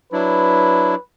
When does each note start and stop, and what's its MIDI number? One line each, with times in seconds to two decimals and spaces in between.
0.13 0.95 54
0.13 0.95 62
0.13 0.95 64
0.13 1.00 71